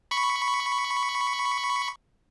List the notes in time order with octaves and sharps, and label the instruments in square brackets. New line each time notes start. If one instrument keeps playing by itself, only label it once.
[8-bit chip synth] B5 C#6